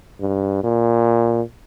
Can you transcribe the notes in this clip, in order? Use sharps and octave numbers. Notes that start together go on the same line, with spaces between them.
G2
A#2